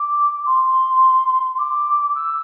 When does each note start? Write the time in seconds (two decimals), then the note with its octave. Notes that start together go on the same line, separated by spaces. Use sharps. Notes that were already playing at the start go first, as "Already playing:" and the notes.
Already playing: D6
0.46 C6
1.58 D6
2.15 E6